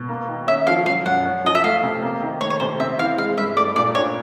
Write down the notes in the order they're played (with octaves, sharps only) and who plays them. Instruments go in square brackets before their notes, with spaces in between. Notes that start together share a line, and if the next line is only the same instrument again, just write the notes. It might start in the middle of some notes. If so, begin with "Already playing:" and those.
Already playing: [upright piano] B2
A#3
D#3
[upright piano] C#4 [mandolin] E5
[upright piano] F3 [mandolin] F5
[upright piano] F#3 [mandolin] F5
[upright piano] F#2 [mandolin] F#5
[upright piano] C#4
[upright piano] F3 [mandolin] D#5
[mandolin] E5
[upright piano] A3 [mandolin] F5
[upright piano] C3
A#3
D#3
[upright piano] A3 [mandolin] C#5
[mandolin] C#5
[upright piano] C3 [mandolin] C5
[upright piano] C4 [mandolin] E5
[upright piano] E3 [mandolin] F5
[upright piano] G#3 [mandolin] F5
[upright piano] G2 [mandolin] E5
[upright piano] A3 [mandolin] D5
[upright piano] A#2 [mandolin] D5
[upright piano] D4 [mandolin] C#5